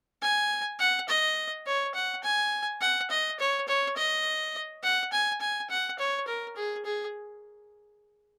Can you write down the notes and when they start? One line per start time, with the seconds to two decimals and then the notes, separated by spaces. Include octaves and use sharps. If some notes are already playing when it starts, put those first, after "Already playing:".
0.22 G#5
0.79 F#5
1.09 D#5
1.66 C#5
1.94 F#5
2.23 G#5
2.81 F#5
3.10 D#5
3.39 C#5
3.68 C#5
3.97 D#5
4.83 F#5
5.12 G#5
5.41 G#5
5.70 F#5
5.99 C#5
6.27 A#4
6.56 G#4
6.85 G#4